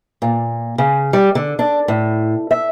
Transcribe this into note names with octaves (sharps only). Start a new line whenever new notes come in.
A#2
C#3
G3
D3
D4
A2
E5